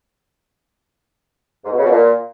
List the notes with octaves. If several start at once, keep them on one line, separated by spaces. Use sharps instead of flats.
G#2
B2
C#3
B2
A#2